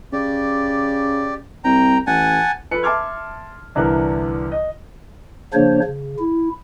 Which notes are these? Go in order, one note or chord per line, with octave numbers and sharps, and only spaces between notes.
C#3 G4 D5
C2 G5 A#5
A1 F#5 G#5 A5
F3 A4 B4 B5 C#7
E5 A5 C6 D6 F6 G#6
C2 D3 E3 A#4 F#6
D#5
C#3 F3 A#3 D4 C5 C#5
C#3
E4